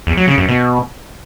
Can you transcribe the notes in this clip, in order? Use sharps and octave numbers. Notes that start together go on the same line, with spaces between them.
E2
F#3
C#3
F#2
B2